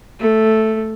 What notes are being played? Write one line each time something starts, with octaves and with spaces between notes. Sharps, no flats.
A3